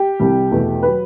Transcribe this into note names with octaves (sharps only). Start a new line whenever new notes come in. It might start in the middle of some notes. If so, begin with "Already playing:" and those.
Already playing: G4
C2 C3 G3
E2 B2 A3
B4
F#3